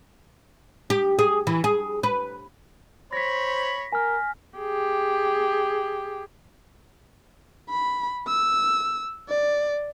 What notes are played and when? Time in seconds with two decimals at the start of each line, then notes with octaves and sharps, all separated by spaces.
0.90 G4
1.19 G#4
1.47 E3
1.64 G#4
2.03 B4
3.13 C5 C#5 B5 A#6 B6
3.92 A#4 G#5 F6
4.58 G4 G#4
7.70 B5
8.27 E6
9.29 D5